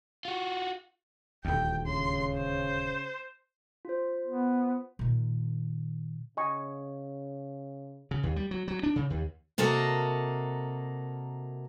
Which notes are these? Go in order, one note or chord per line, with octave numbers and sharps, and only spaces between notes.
F4 F#4
D#1 D2 G5
C#3 C6
C5
F4 C5
B3
A#2 D#3
C#3 D#5 G#5 C#6
C#3
D#2
G3
F#3
F#3
D4
C#3
D#2
C3 A#3 F#4 A4 A#4 D#5